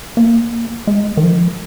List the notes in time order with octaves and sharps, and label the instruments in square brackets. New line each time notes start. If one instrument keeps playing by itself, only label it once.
[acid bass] A#3
G#3
D#3
F3